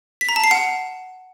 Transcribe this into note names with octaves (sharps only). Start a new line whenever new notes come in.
B6
A#5
A5
C7
F#5